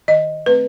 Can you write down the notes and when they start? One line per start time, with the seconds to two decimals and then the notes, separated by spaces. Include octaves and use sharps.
0.08 D#3 D#5
0.46 A3 C4 B4